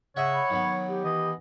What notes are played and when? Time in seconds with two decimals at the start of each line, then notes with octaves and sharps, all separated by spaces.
0.16 C#3 C#5 D#5 E5 F#5
0.34 B5
0.50 D#3 F#3 B3
0.88 G4
1.04 E3 D#5